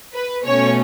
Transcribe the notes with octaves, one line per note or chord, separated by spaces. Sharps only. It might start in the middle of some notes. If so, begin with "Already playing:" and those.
B4
B2 A3 C#4 C#5